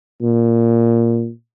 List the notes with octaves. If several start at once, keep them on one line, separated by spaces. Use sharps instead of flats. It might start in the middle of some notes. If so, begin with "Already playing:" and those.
A#2